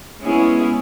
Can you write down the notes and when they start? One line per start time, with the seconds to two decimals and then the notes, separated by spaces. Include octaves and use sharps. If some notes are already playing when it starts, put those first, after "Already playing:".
0.20 G#3 B3 C#4 E4 G#4